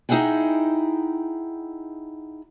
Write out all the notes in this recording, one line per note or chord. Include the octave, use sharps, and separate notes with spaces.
D#4 E4 G#4 F#5 G5